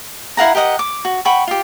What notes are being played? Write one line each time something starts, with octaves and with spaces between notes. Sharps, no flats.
E4 F5 F#5 A#5
G4 A#4 D#5 F#5
D6
F#4
F#5 G5 B5 C#6
F4 G4